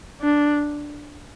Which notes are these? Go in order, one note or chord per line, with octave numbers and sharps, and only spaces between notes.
D4